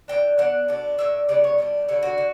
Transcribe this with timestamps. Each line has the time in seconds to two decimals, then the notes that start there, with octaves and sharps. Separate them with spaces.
0.08 E3 B3 D4 G5
0.38 E3 B3 D4 F#5
0.68 B2 A3 D4
0.98 A2 G3 D4 E5
1.29 C#3 G3 B3 D5
1.44 C#5
1.58 B2 G3 D4
1.88 D3 G3 D4 C#5
2.03 F#4
2.18 D3